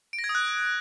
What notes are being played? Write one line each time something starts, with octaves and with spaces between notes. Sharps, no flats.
D7
A#6
G#6
D#6
F#6